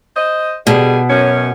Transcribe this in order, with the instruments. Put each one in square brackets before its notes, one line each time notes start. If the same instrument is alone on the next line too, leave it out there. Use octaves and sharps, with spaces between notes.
[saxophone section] C5 D#5
[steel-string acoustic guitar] B2 [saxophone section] D3 G3 G#4
[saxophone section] F#2 C#4